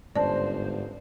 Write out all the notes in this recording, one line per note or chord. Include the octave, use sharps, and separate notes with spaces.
G1 G#2 G#3 C#4 C5 D5 A5